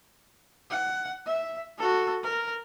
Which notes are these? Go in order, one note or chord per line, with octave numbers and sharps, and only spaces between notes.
F#5
E5
F#4 A4
A#4